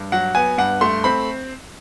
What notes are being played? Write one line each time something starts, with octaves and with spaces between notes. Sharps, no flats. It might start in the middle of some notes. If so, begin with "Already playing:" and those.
Already playing: G2
F#3 F#5
B3 G#5
G2 F#5
A3 C6
C4 B5